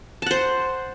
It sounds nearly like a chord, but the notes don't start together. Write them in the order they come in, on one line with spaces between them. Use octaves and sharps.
A5 F#5 C5